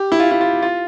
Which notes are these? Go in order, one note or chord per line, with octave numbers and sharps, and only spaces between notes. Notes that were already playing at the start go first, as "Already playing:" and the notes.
Already playing: G4
E4
F4
E4
F4
F4